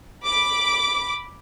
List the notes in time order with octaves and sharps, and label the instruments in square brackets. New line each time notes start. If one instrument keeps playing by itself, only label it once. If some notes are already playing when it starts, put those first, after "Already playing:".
[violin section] B5 D6